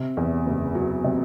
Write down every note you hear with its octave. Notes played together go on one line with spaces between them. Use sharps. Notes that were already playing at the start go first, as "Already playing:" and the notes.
Already playing: C3
E2
F#1
F#3
C3